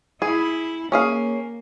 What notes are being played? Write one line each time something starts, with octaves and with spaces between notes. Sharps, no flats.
E4 G#4
A#3 C#4 G#4 F5